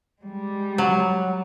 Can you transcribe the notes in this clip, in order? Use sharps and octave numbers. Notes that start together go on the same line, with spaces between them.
G3 G#3
F#3